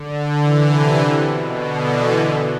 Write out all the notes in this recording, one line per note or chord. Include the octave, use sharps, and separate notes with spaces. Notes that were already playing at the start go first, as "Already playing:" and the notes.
Already playing: D3
E3
C3
C3
B2
D3
E3
E3